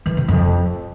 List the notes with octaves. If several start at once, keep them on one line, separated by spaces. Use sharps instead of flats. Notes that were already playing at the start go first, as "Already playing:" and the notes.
E3
C3
F2